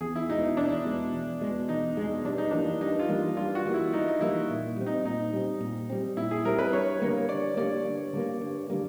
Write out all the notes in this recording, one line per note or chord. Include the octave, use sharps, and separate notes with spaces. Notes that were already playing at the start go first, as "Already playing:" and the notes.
E2 G#4
E4
B2 G#3 D#4
D#4
E2 D4
B2 G#3
E2
B2 G#3
E2 D#4
B2 G#3
G2 D4
D#4
E3 G3 A#3 D4
G2 D#4
F4
E3 G3 A#3
G2 F4
F#4
E3 G3 A#3
E4
G2 D#4
D#4
E3 G3 A#3 E4
A#2
G3 C4
D#4
A#2 D#4
G3 C4
A#2
G3 C4
A#2 E4
G#4
G3 C4 A#4
B4
G2 C#5
D3 G3 A#3
G2 D5
D3 G3 A#3 D5
G2
D3 G3 A#3
G2
D3 G3 A#3